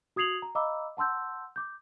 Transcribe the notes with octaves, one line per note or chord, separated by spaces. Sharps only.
F#4 D#6 G#6 C7 F7 F#7
A#5
D#5 F5 A#5 B5 D6 E6
F#5 A5 C6 E6 G6
D6 G6